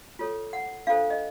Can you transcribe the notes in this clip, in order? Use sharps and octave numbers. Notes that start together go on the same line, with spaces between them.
F4 A4 C#5
F#5
D4 F4 A4 C5 F5
D#5